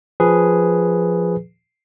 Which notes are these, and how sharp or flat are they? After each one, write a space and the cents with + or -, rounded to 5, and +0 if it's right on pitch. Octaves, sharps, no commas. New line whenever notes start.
F3 +0 G#4 +0 B4 +0